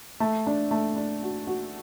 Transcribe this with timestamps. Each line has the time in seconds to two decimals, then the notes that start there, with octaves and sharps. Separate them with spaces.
0.20 A3
0.47 D4
0.71 A3
0.96 D4
1.23 F#4
1.47 F#4